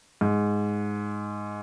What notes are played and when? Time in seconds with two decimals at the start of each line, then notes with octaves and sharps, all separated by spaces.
0.21 G#2